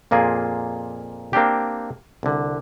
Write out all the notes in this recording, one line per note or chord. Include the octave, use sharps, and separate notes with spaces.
F2 A#2 A#3 F4 G#4
A#3 C4 D4 G4
C2 D3